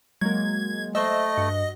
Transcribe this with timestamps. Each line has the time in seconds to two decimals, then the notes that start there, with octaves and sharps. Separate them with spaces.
0.21 F#3 G#3 A#3 G#6
0.95 A3 C5 D#5 E5
1.37 G2 F#4